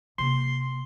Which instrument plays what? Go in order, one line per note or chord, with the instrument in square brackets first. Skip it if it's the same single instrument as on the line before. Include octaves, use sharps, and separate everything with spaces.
[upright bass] C3 A#3 [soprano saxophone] C6